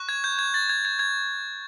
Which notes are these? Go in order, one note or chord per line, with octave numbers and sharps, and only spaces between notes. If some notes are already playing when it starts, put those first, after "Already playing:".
Already playing: C#6 F#6
G#6
G6
G#6
A6
G#6
G#6
G#6